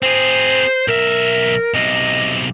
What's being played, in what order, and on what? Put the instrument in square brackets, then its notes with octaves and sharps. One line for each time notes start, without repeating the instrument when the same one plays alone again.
[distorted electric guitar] C4 G#4 [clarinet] C5
[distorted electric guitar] B1 E5 [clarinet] A#4
[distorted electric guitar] B1 C3 [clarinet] D#5